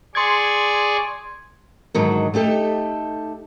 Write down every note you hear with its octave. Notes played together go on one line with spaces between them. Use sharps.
G#4 D5 C6 C#6 G#6
G#2 D3 D#3 F#3
A3 D#4 G4 A4